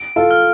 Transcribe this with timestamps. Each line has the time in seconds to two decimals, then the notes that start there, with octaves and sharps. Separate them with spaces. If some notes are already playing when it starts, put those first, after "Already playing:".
Already playing: D7
0.16 F4 A4
0.31 F6